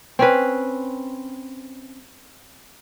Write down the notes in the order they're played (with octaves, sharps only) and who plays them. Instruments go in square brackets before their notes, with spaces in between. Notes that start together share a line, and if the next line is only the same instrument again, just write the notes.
[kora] C4 C#4 B4